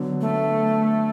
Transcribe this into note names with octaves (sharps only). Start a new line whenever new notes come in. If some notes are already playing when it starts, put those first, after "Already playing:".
Already playing: D3 F#3 B3
A3